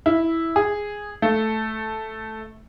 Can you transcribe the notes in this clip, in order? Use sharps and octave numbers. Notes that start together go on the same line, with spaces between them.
E4
G#4
A3